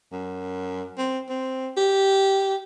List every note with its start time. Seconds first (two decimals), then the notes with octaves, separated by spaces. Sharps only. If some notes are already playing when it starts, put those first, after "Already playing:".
0.12 F#2
0.97 C4
1.29 C4
1.77 G4